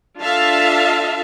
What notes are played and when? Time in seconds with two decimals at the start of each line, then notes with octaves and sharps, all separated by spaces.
0.19 D4 F4 A4 E5 F5 A5